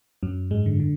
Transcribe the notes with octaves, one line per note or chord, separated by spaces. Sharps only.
F#2 F#3
G#2 G#3
D3
D3